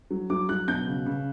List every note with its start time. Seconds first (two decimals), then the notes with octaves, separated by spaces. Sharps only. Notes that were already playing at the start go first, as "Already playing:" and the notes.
0.11 F#3
0.30 F#3 D6
0.49 F#3 F#6
0.68 B2 G6
0.87 C#3
1.06 C#3